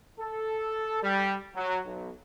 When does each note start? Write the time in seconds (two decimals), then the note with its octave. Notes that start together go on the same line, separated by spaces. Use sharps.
0.20 A4
1.03 G3
1.56 F#3
1.86 B1